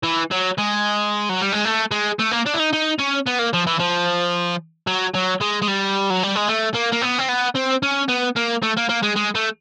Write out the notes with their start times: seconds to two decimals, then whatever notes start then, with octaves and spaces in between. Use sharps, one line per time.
0.03 E3
0.31 F#3
0.58 G#3
1.29 F#3
1.41 G3
1.52 G#3
1.65 A3
1.91 G#3
2.19 A3
2.31 A#3
2.46 D4
2.54 E4
2.59 D#4
2.73 D#4
2.99 C#4
3.26 B3
3.39 A#3
3.53 F3
3.67 E3
3.80 F3
4.87 F#3
5.14 F#3
5.41 G#3
5.62 G#3
5.68 G3
6.10 F#3
6.23 G3
6.36 G#3
6.48 A3
6.74 A#3
6.92 A#3
7.01 B3
7.18 C4
7.29 B3
7.55 C4
7.83 C#4
8.08 B3
8.36 A#3
8.63 A3
8.77 A#3
8.89 A#3
9.03 G#3
9.16 G#3
9.35 A3